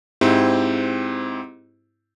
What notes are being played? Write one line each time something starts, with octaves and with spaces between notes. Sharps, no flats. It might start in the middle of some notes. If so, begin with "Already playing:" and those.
G#2 C4 E4 G4